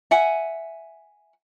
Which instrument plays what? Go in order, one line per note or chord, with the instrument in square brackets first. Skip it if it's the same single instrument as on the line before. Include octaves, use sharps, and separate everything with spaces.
[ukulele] E5 F#5 G#5